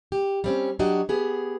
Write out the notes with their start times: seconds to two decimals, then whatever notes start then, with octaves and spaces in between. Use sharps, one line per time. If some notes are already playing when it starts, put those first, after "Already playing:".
0.12 G4
0.44 G3 C4 C#4
0.79 F#3 D4 F#4 G4 D#5
1.09 B3 G4 G#4